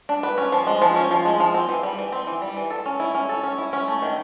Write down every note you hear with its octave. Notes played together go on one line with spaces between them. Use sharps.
D4
B4
C#4
F3
G#3
F3
C#4
F3
G#3
F3
C4
E3
G3
E3
C4
E3
G3
E3
A4
C#4
E4
C#4
A4
C#4
E4
C#4
A3
D#3